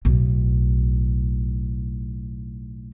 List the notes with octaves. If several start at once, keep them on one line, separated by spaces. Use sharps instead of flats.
B1 A2